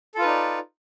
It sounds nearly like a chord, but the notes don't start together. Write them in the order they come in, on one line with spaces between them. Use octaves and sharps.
A4 F4 B4 D#4 D5